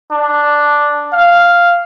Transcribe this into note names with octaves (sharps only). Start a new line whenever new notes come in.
D4
F5